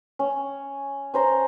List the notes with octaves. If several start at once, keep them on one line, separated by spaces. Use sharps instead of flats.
C#4
C#4 C5 A#5